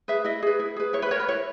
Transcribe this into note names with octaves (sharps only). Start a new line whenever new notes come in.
G#4 B4 E5
E4 D#5
G#4 B4
E4
G#4 B4
E4 C#5
B4
A#4 C#5
B4
E4 C#5